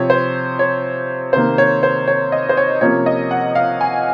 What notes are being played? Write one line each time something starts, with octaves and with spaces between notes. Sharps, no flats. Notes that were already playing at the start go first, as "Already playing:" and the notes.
Already playing: C3 F3 C4 C#5
C5
C#5
C3 D#3 A#3 C5
C#5
C5
C#5
D#5
C5
C#5
C3 F3 A#3 C#4 C#5
D#5
F#5
F5
G#5